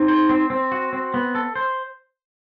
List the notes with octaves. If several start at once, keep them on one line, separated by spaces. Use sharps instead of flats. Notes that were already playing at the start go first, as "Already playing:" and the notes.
Already playing: C4 D#4
C5
C4
C4
F#4
C4
B3
A4
C5